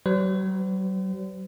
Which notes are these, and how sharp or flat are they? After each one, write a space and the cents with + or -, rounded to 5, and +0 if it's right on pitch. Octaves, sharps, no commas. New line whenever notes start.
F#3 +45 C5 -45